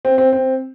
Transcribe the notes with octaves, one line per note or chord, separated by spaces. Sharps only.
C4
C4
C4